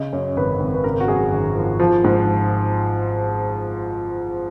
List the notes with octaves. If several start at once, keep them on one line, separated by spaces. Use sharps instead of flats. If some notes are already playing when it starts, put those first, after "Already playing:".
Already playing: C#3 D#5
F#2 C#5
G#1 B4
G#1
B4
C#3 A#4
F#4
F#2 G#4
G#1
F3
F3
G#2